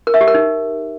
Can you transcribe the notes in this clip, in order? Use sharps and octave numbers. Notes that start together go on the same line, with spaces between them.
A#4
E5
G4
A#4
D#4